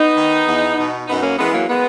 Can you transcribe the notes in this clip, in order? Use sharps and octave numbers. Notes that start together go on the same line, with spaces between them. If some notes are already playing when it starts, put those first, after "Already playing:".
Already playing: B3 D#4
D#3
E2
B2
F#2 B3 D#4
A#3 C#4
E3 G#3 B3
F#3 A#3
G#3 B3